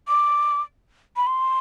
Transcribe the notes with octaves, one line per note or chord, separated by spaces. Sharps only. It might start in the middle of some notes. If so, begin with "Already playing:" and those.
D6
B5
C6